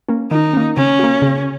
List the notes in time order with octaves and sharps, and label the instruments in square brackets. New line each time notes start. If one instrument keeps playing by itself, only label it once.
[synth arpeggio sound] A#3 C#4
[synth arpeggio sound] D#3 [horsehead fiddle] D#4
[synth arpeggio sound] A#3 C#4
[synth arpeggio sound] C#3 [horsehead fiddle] C#4
[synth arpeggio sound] A#3 F#4
C#3